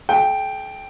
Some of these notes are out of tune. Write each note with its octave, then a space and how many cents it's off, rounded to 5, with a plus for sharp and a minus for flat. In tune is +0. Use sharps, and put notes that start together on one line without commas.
A4 -45 G5 +0